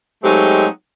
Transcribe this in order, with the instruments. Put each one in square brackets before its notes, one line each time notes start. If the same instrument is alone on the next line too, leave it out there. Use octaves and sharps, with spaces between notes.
[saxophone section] F#3 G#3 A3 C4 D#4 G4